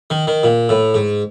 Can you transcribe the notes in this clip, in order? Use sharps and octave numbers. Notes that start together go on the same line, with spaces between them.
D#3
D#3
A#2
A2
G#2